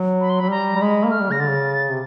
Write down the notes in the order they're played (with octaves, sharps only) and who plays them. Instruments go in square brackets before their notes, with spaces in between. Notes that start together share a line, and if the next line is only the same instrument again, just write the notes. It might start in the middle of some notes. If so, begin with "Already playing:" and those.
Already playing: [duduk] F#3
[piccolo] B5
C6
[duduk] F#3 [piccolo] B5
[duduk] G3 [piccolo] A#5
[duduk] G3
[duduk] G#3 [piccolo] B5
[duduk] A#3
[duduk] A3 [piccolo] F6
[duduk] G3
[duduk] C#3 [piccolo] A#6
[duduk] D3 [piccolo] A6
[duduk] C#3
C3